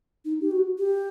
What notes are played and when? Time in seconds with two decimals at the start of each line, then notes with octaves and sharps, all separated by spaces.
0.25 D#4
0.41 G4
0.51 F#4
0.78 G4